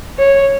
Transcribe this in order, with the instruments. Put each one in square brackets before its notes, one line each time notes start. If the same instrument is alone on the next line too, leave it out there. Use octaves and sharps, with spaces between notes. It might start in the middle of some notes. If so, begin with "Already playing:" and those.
[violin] C#5